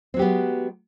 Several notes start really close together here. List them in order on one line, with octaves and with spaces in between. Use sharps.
C4 F#3 G4 B3 G#3